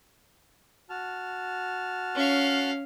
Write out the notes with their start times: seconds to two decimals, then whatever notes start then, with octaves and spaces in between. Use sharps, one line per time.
0.90 F#4 A5 F6
2.15 C#4 F5